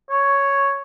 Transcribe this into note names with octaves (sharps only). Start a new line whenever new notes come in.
C#5